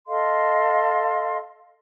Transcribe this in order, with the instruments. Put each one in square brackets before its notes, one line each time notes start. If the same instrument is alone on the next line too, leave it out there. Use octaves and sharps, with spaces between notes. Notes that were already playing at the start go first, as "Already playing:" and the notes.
[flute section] A4 D#5 F5 C6